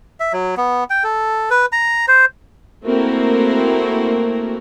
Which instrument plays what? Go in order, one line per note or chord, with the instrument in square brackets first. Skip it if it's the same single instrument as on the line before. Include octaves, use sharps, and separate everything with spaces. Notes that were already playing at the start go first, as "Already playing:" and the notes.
[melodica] E5
F#3
B3
G5
A4
B4
A#5
C5
[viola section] A3 A#3 C4 E4 F#4 A#4